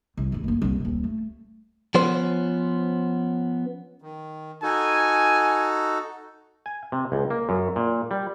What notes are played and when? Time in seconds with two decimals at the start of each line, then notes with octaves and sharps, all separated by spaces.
0.17 C2
0.32 E2 A2
0.44 F#1 A#3
0.62 C2 A#2
0.80 D#1 C4
1.04 A3
1.95 F3 B3 C#4 C5
4.02 D#3
4.63 D#4 F#4 A4 G#5
6.66 G#5
6.92 C3
7.12 C#2
7.30 A#3
7.49 F#2
7.76 A#2
8.11 G3